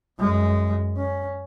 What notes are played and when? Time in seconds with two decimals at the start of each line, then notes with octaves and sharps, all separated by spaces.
0.19 F#2 G#3
0.97 C#4